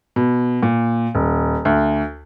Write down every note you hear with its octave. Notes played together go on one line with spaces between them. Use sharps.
B2
A#2
D#1
D2